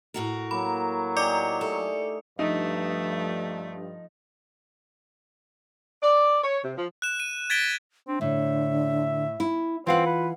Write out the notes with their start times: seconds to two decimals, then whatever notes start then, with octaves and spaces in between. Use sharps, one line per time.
0.14 A2 F#4 A#4
0.51 F#3 A#3 B5
1.17 D#4 G4 G#4 D5 D6 C#7
1.61 A3 G#4 A4
2.39 G2 F3 A3 D#4
6.02 D5
6.43 C#5
6.64 C3
6.76 F3
7.02 F#6 E7
7.20 D#7
7.50 G#6 A6 B6 D7 G7
8.08 C4 D4
8.21 A2 D3 E5
9.40 E4
9.87 E3 C4 F4 F5 F#5
10.06 B4